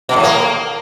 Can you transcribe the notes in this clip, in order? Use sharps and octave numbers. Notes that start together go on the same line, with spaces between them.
B2
A2
A#3